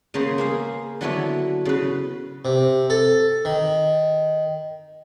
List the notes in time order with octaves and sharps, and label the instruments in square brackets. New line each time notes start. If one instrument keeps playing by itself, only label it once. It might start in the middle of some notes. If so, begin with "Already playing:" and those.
[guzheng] C#3 A#3 B3 C5 C#5 A#5
A#3 G#4 F5
D3 F#3 B3 E4 A4 C#5
C#3 B4
[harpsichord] C3
A4
D#3